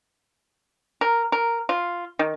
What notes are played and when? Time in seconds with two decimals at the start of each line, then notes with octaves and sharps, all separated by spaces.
1.01 A#4
1.32 A#4
1.69 F4
2.19 D#3